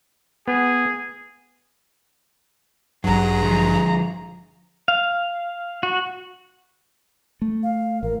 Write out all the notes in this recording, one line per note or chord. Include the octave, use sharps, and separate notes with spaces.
B3 G#4
A1 G2 F#3 G#4 A#5
D3 F3
F5
F#4
A3
F5
A1 A#4